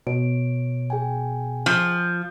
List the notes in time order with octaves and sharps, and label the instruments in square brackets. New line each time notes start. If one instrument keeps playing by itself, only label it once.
[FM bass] B2 [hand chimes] B3 C#5 D7
[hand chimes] G#4 G5 G#5
[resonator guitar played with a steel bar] F3